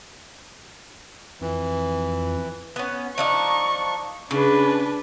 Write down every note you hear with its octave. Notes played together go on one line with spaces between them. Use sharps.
F2 E3
B3 C#4
F3 D4 D#4 C#6
C#3 D4 B4